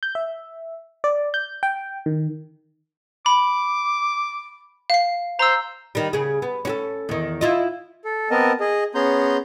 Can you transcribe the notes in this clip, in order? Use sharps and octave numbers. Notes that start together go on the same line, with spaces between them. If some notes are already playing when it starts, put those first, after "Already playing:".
G6
E5
D5
G6
G5
D#3
B5 D6
F5 C7
C5 A#5 E6
D#3 G3
C#3 G#4
B3
C#4 F#4 A4
E2 D#3
E4 F4 D#5
A4
B3 C4 A#4 D#5 A5
G#4 D#5
B3 C#4 G#4 A#5 C6 G6